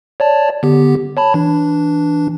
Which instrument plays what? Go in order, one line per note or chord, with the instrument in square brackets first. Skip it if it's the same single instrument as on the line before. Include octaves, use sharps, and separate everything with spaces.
[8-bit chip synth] C#5 D5 A5
D3 B3 G4
C#5 A5 B5
E3 D4